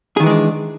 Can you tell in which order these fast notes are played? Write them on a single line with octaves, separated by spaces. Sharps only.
G#4 D#3 E3 G#3 D4